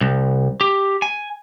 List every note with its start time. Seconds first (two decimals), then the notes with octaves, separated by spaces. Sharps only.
0.01 C2
0.61 G4
1.02 G#5